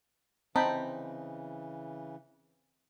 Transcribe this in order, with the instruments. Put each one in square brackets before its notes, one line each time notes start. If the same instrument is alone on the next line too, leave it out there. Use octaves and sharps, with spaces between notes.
[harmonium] C#3 E3 [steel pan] C4 G5 B5 [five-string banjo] D#4 [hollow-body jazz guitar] A5